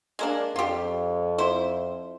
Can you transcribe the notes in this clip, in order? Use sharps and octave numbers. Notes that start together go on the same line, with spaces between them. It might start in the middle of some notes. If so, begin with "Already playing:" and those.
G#3 A#3 D4
F2 F4 G4
E4 C5